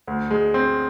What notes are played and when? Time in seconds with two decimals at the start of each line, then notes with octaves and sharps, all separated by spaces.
0.07 D2
0.31 G#3
0.54 C4